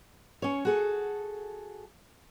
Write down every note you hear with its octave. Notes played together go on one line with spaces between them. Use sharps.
C#4 C#5
F#4 G#4 A4